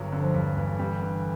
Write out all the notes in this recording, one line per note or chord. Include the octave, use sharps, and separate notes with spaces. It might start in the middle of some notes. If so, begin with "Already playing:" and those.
Already playing: G1 G2 F#3
D3
F3
G2
E3
G1
G3
D3